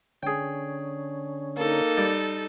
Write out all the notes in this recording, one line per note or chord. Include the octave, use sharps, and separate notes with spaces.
D3 C#4 G#4 G5
A#3 D#4 A4
G3 D5